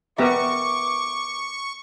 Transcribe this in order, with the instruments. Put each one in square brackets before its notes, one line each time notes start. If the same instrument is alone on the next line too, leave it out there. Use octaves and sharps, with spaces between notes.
[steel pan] B3 G4 A#5 [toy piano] A#4 B4 E5 [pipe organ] C#6 [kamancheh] D6